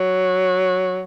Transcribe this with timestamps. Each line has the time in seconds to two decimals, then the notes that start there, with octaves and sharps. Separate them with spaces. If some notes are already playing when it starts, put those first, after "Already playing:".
Already playing: F#3